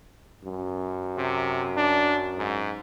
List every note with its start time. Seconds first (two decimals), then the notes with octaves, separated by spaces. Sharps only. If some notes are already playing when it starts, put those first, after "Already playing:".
0.44 F#2
1.17 C3
1.77 D4
2.38 G#2